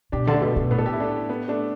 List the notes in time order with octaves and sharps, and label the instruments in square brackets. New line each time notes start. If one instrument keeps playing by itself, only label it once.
[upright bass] B2 [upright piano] D4 G4
[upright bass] D3
[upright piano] A3 D4
[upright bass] B2
[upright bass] B2 [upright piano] A3
[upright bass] A2 [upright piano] B3
[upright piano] A4
G4
E4
A3 D4
B3
A3 D4